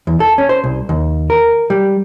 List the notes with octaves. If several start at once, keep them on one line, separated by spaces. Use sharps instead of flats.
E2
A4
C#4
C5
C2
D#2
A#4
G3